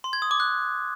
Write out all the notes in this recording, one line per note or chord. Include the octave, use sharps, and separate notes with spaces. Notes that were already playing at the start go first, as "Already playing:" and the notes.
C6
G#6
D#6
D6
F#6